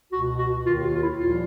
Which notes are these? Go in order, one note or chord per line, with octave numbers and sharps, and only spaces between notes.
C#2 B2 F#4
F#4
D#2 D#3 F4
F4
F4
E4
C2 A#2 F3 F4